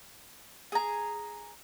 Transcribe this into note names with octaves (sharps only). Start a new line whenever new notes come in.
G#4 A#5